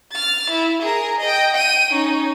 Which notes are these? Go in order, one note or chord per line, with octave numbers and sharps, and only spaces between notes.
F6 A6
E4
G#4 A#4
D#5 G5
G5 D#7
C#4 D#4